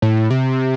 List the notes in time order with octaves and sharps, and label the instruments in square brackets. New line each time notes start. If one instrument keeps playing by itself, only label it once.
[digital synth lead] A2
C3